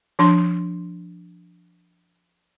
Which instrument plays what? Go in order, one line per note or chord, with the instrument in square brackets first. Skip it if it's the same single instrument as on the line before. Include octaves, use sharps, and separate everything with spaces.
[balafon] F3 D4 C6